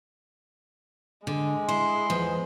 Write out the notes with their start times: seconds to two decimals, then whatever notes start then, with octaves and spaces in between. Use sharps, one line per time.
1.27 D3 G#3
1.69 E4 C6
2.10 E2 F3